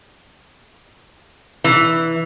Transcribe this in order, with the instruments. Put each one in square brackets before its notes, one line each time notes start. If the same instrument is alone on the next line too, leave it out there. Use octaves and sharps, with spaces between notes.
[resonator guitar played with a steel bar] E3